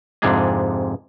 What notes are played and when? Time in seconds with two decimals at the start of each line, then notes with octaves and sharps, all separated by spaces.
0.22 F2 G#2 C3 D4 G#4 D#5